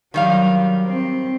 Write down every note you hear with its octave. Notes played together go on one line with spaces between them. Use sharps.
D#3 F#3 G3 F5
C4